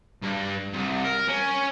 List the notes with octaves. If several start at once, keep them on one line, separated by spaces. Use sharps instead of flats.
G2
C2
A#4
C#4